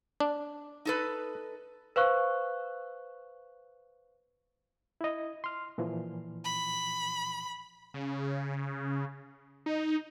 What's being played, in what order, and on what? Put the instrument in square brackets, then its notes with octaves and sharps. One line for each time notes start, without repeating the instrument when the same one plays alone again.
[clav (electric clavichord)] D4
[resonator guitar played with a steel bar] D#4 A4 B4
[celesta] B4 C5 F5 C#6 F#6
[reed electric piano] E4 D#5
C6 F6
A#2 E3 F3
[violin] B5
[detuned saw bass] C#3
D#4